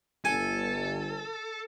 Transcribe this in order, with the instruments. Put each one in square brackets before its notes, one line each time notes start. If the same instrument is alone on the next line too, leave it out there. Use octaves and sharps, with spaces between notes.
[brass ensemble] G1 [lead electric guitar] A4 [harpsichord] G#5